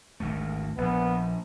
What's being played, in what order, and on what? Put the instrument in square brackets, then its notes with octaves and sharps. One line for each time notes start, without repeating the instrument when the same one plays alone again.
[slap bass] G#1 D2 A3
[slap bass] A#1 [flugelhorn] B3